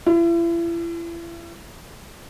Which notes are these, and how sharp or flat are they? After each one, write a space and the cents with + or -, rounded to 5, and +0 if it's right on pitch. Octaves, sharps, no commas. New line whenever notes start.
E4 +40